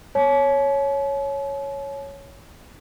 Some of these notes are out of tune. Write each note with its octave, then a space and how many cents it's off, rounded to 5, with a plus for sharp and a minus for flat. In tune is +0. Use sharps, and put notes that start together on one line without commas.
C#5 +0 A5 -45